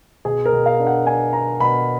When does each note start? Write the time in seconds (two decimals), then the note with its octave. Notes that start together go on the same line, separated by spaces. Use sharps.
0.25 B2 G#4
0.45 A#4
0.53 B2
0.66 F5
0.80 D4
0.86 F#5
1.06 D4 G#5
1.33 D4 A#5
1.60 B2 B5